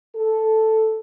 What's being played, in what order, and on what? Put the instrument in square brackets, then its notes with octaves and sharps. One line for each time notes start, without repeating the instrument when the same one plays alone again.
[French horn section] A4